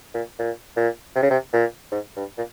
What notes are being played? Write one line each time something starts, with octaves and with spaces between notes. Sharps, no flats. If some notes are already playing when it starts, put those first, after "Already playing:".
A#2
A#2
A#2
C3
C#3
C3
A#2
G#2
G2
A#2